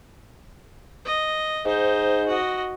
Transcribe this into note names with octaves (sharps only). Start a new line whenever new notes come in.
D#5
G#2 D#4 C5
F#4 D#5